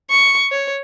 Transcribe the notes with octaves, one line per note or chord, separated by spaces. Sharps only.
C#6
C#5